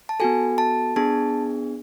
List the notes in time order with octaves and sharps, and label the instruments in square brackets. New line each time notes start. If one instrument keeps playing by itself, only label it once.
[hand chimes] A5
B3 F#4 A4 G#5
A5
B3 D4 G#4 A5